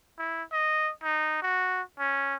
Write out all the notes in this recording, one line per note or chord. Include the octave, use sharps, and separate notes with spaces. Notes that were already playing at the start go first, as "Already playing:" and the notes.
E4
D#5
D#4
F#4
C#4